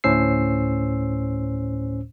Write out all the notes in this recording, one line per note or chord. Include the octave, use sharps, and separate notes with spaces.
D2 A2 C#4 C5 E6 C7